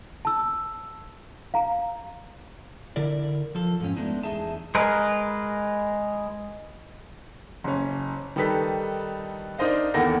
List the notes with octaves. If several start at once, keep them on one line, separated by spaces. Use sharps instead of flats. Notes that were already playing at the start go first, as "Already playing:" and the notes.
A5 E6
F5 A#5
D3 E4 A#4 D5
F3 A4
F2 G#2 C#4
G#3 A3 B3 D4 D#4
E2 D#4 G#4 E5 A5
G#3 A#4 B4
F#1 C#4
D#3 G3 D#4 A4 B4 B6
D4 D#4 A#4 C5 D#5 F5
E2 D#3 A#3 A4 F#5 A#6